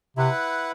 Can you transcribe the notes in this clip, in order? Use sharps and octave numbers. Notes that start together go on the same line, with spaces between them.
C3 E4 B4 F#5